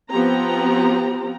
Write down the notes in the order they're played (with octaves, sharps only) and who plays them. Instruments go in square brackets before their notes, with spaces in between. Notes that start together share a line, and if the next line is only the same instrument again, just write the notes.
[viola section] F3 B3 C4 G4 A#5